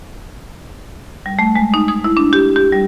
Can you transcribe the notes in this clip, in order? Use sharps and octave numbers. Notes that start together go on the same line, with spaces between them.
G3
A3
G#3
D#4
D#6
E4
D4
G4
G4
G3